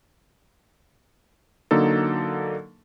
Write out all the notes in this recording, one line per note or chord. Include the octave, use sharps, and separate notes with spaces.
D3 F#3 A#3 D#4 A4